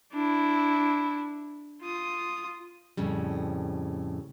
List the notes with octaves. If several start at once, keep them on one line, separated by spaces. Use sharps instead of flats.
D4 E4
F4 D#6
F2 A2 C#3 G3